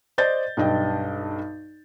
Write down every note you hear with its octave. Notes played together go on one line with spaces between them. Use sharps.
C5 D5 D#5 G6 A6
B1 G2 D#5 G5